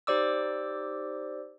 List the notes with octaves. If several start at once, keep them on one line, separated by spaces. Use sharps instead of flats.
D#4 G4 C5 D5 D6 E6